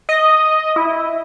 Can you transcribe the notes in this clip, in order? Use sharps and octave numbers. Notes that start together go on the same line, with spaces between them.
D#5
E4